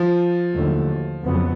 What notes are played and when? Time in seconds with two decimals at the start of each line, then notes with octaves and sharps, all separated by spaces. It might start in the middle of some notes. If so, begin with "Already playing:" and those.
Already playing: F3
0.56 D#2 D3 F#3 A3
1.24 F2 C#3 F#3 B3